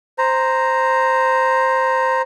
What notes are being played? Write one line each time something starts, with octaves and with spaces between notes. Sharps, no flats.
C5 A#5